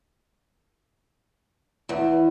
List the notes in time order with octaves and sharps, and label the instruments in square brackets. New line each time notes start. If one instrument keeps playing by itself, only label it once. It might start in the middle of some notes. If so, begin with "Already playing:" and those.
[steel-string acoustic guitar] E2